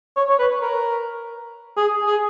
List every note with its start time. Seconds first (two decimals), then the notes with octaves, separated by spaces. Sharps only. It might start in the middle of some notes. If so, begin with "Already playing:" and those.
0.16 C#5
0.29 C#5
0.39 B4
0.61 A#4
1.77 G#4
2.07 G#4